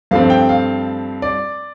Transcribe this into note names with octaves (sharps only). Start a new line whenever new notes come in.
G2 F3 A3 C4 F5
G5
F5
D5